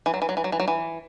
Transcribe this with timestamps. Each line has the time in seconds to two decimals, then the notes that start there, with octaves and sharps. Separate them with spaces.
0.06 E3
0.14 F#3
0.22 E3
0.29 F#3
0.37 E3
0.44 F#3
0.52 E3
0.60 F#3
0.68 E3